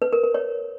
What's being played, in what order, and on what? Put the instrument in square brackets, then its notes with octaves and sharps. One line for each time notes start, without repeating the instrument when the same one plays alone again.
[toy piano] B4
A#4
A#4
C#5